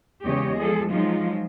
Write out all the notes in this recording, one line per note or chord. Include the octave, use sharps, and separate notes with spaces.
E2 C#3 G#3 G4 C#5 D#5
F3 G#3 G#4 A4
F3 F#3 G#3 D#4 F4